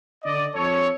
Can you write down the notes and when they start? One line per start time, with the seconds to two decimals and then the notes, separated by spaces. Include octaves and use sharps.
0.24 D3 D5 D#5
0.55 F2 A4 C#5